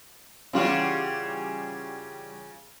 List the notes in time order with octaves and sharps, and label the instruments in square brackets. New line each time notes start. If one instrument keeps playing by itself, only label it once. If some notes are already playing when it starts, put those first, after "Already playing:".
[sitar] C#3 F4 F#4 [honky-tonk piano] E3 G3 C#4